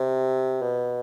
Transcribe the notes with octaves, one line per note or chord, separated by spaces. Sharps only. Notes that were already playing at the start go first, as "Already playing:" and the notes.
Already playing: C3
B2